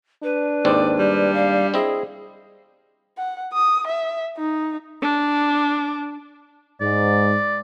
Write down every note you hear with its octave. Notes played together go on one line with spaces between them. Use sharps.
D4 B4
D#2 G#2 C4 D5
G3
F5
C4 E4 G#4 D#5
F#5
D#6
E5
D#4
D4
G#2 D5